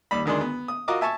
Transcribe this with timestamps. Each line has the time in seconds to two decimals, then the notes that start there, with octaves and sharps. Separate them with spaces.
0.11 D#2 G3 B5
0.26 D2 D#3 G#3 D4 C6
0.41 B3
0.68 D#6
0.88 F4 F#4 A#4 D#5 D6
1.01 E5 G#5 A5 C#6